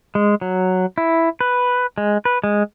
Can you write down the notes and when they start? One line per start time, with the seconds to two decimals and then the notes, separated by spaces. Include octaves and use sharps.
0.15 G#3
0.41 F#3
0.98 E4
1.41 B4
1.98 G#3
2.25 B4
2.44 G#3